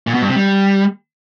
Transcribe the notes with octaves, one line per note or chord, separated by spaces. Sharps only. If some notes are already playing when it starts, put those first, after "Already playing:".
A#2
B2
G2
C3
G3